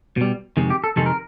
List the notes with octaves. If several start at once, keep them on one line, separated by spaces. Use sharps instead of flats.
B2 G3
F2 C3 D#3 G#3
G4
A4
F2 C3 D#3 G#3 A4
A#4